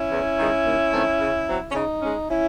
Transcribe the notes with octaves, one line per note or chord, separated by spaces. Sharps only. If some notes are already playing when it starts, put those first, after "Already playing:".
Already playing: C#4 E4
E2
D#3 G#3
D#2
D#3 A3 C4
C#3
F#3 C4
C#4
C#3 D#4
G#3 C#4
C#4 E4